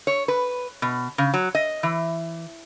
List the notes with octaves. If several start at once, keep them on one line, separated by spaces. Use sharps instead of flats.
C#5
B4
B2
C#3
F#3
D#5
E3